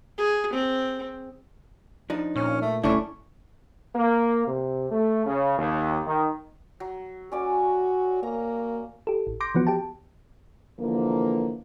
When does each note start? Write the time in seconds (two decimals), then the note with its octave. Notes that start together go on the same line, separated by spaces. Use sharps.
0.18 G#4
0.53 C4
2.10 F3 D4 D#4
2.36 A#2 C#4
2.62 A3
2.83 D#1 A3 C#4 D4 E4
3.95 A#3
4.47 C3
4.91 A3
5.25 C#3
5.58 D#2
6.06 D#3
6.80 F#3
7.32 C#4 F#4 D5 G#5
8.23 A#3 A#5
9.07 G4 A4
9.27 A1
9.40 C6 D6 G6 A#6 D7
9.55 E3 F3 B3 F#4
9.67 G4 G5 A5
10.79 D3 E3 F3 A#3